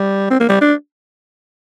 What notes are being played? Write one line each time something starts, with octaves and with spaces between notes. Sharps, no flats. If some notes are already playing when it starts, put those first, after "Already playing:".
Already playing: G3
C4
A#3
G3
D4